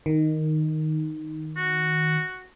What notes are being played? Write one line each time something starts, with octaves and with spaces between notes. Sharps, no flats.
D#3
F#4